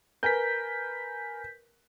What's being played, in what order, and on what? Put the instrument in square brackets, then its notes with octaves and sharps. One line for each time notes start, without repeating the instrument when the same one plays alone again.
[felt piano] A#4 B4 G#5 [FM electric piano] G6 B6